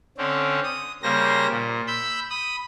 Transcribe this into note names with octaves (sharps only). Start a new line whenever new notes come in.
D3 C4 C#4
D#6
C#3 G3 A#3 C5 A#6
A#2
B5 E6 G6
B5 D#6